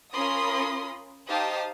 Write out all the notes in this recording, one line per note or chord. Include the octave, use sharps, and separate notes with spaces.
C#4 F4 A#4 B5 C6 D#6
D#4 G4 C5 F5 A5 D#6